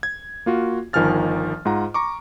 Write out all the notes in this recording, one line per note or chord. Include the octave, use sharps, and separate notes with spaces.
G#6
A#3 F4 F#4
G1 D#3 F3 G#5 F6 A6
G#2 F4 F#5 A#5
A#5 C#6 D6